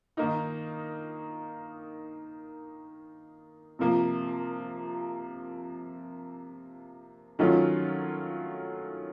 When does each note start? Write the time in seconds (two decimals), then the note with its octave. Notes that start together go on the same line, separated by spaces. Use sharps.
0.17 D#3 A#3 D#4
3.79 C3 F3 A#3
7.39 D#3 F#3 A3 C#4 F4